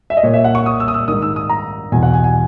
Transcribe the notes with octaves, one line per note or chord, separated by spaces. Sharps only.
E5
D#5
A#2 C#5
E5
F#5
C#6
D#6
E6
D#6
E6
G#2 D#3 D#6
E6
D#6
A#5
E2 B2 G#5
F#5
G#5
G#5